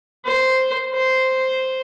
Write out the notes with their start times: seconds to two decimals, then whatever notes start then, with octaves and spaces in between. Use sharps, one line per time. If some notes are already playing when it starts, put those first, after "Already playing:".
0.25 C5
0.93 C5